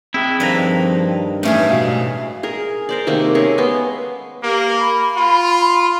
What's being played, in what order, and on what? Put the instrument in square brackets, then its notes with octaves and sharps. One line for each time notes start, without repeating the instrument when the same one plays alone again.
[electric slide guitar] C4 G#4 G5 [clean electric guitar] E4
[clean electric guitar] G2 D#3 A#5 [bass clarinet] F3 [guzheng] A#3 B4
[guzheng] A2 E3 G#4 [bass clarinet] A3 [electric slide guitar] C#4 D#4
[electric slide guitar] G#2 F5 [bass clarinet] B2
[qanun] G#4 A#4
A#4 C5 D5
C3 D#3 A3 A#3
A3 C#4 G#4 A#4
G#3 B3 C6
[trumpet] A#3 [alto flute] G4
[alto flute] B5
[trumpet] F4